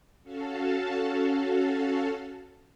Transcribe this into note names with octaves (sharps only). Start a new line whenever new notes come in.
C#4 F#4 A4 F5 A5